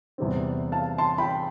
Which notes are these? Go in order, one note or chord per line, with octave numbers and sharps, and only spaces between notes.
E2 C3 G3 C4
F5 A5
A5 C6
G5 B5